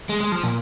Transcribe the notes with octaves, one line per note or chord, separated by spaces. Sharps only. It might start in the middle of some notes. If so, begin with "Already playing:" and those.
G#3
G#3
F3
A#2